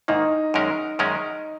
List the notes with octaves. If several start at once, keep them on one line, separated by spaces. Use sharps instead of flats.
G#2 D#3 A#3 D#4
F#2 D#3 G#3 C#4 A#4
F#2 D#3 G#3 C#4 A#4